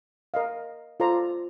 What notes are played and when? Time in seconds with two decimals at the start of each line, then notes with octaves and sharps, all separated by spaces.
0.34 A#4 D#5 F5
1.00 F4 A4 C5 D5 A#5